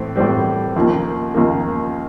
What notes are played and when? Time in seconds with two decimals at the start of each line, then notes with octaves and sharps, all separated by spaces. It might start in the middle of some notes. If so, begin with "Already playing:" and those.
Already playing: A2 E3 C4
0.16 A2 E3 G3 C4
0.76 D#2 C#3 F3 A#3
1.34 D#2 C#3 F3 A#3